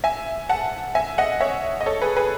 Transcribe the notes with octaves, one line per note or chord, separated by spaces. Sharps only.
E5 G#5
F#5 A5
E5 G#5
D#5 F#5
C#5 E5
D#5
A4 C#5
G#4 B4
G#4 B4